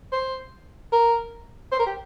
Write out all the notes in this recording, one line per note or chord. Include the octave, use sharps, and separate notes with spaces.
C5
A#4
C5
A#4
G4